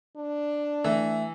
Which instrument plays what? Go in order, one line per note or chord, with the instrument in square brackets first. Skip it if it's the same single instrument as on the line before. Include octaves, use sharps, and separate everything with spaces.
[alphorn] D4
[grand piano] E3 [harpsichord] A3